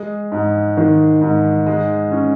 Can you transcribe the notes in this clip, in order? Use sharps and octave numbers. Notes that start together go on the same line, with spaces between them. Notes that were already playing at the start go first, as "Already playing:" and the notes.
Already playing: G#3
G#2
D#3
G#2
G#3
C#4